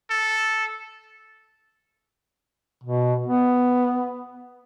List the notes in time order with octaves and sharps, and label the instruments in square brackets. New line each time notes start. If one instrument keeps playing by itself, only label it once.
[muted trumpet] A4
[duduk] B2
B3